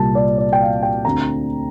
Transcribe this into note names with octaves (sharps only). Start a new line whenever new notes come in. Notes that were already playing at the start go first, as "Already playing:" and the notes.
Already playing: C2 A#2 G3 A#3 A5
D5
D5
G5
F5
G5
D2 D3 A3 C4 A#5